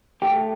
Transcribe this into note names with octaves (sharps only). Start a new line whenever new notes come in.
A3 G4 G5